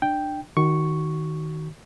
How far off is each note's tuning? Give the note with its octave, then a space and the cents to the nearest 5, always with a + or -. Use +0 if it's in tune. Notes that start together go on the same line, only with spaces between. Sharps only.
D4 +25 G5 +0
D#3 +0 F#4 +20 C#6 +0